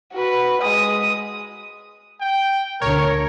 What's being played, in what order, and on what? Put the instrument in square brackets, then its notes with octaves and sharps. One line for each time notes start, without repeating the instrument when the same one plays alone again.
[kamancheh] F#4 B4
G#3 D#6
[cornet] G5
[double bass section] D2 [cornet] A#4 [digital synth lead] C#5